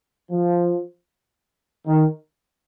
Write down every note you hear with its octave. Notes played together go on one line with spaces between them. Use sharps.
F3
D#3